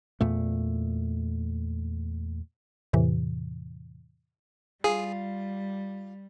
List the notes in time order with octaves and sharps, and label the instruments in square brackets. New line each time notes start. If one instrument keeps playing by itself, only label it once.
[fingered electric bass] E2 A#2 A3
[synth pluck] E2 A2 C3 E3
[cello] G3 [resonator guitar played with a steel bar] F4 [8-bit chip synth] G#4